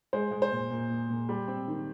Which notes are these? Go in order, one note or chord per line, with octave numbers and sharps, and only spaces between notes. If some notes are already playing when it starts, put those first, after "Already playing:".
G#3 C5
G#3
C5
A#2
A#2
A#2
A#2
G3
C4
D#3